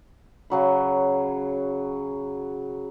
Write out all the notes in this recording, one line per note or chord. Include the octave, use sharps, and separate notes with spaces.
C#3 F#3 B5